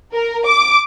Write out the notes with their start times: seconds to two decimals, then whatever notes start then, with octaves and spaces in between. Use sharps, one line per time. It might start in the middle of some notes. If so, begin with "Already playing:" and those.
0.13 A#4
0.45 D6